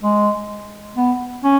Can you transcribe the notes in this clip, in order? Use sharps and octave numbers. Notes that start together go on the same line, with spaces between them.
G#3
B3
C#4